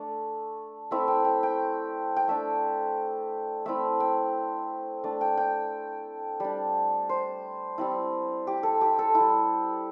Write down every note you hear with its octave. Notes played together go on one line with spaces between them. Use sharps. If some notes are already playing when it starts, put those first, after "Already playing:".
Already playing: A3 D4
A3 C4 E4 E5
G5
G5
G5
G5
A3 D4 E5
A3 C4 E4 E5
G5
A3 D4
G5
G5
G3 D4
C5
G3 C4 E4
G4
A4
G4
A4
E4
G3